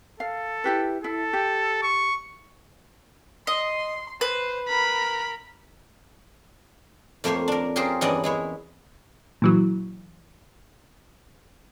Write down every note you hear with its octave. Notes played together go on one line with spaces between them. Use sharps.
A4 F5
E4 G4 B4
E4 A4
G4
C#6
D#5 C6
B4 C5
A#4 B5
F2 A3 A#3 C5 C#5
D4 A#4
C#4 F4 G4 G#4 A#4 C5
E2 G2 C#4 D5 D#5 F#5
G#3 E4 C#5
A#2 E3 F#3